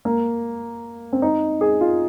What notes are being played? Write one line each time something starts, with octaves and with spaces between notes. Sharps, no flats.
A#3
C4
D#4
G#4
F4